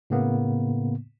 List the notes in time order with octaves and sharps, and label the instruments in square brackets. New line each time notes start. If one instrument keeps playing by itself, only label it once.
[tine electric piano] A2 C#3 A#3 B3